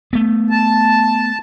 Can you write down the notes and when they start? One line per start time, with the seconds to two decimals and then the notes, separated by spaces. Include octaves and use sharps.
0.13 A3 B3
0.50 A5